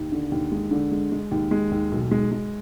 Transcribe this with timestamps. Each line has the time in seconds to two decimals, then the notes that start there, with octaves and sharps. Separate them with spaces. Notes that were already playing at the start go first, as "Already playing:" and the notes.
Already playing: D#2
0.12 D3
0.32 D#2
0.52 G#3
0.71 D3
0.92 G#3
1.12 G#3
1.31 D#2
1.51 G#3
1.71 D#2
1.92 B1
2.11 G#3
2.31 G#3